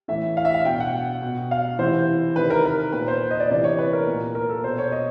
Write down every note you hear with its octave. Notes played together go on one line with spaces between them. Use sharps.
A2 E3 E5
F5
E5
F5
B2 G5
F#5
B2
F5
C3 E3 C5
C3 D#3 B4
A#4
A#4
A#2 B4
C5
D#5
D5
C3 E3 D5
C#5
B4
A#4
A#2
A#4
A4
B2 C5
C#5
D#5